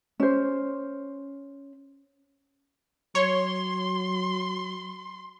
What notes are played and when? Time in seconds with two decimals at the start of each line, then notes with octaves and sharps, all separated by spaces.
0.20 C#4 C5
3.15 F#3 C#5 C6